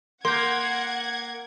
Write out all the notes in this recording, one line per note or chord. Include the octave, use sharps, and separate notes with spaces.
A#3 F#5 C6 G6 G#6